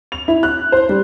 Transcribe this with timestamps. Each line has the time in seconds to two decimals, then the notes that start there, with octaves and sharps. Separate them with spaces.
0.12 F7
0.28 E4
0.43 F#6
0.72 C5
0.89 G3